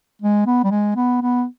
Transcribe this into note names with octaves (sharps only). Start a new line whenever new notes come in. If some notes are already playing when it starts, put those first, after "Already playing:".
G#3
B3
G3
G#3
B3
B3